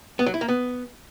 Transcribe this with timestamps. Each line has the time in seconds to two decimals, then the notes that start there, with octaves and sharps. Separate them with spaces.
0.19 B3
0.26 F#3
0.34 E4
0.41 A#3
0.48 B3